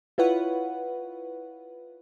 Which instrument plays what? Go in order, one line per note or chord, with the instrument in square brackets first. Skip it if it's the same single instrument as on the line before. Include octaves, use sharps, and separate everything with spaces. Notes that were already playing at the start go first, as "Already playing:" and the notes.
[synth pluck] E4 F4 B4 C#5 F#5